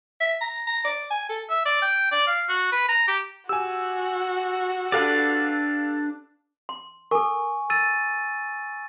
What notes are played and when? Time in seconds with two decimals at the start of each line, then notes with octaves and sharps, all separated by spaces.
0.20 E5
0.41 A#5
0.67 A#5
0.85 D5
1.10 G#5
1.29 A4
1.50 E5
1.65 D5
1.82 G5
2.12 D5
2.27 F5
2.49 F#4
2.72 B4
2.89 A#5
3.08 G4
3.49 F#4 G4 G#5 E6
4.92 D4 G4 A4 B4 D5 F5
6.69 C6
7.11 A4 A#4 G#5 C#6
7.70 E6 A6 D#7